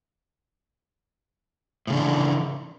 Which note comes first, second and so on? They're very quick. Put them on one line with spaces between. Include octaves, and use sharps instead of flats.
A2 C#3 D4 E3